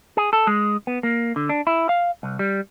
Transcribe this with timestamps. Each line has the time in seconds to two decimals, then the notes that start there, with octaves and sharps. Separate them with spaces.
0.17 G#4
0.33 A4
0.47 G#3
0.87 B3
1.03 A#3
1.36 D3
1.49 D4
1.67 E4
1.89 F5
2.23 C2
2.39 G3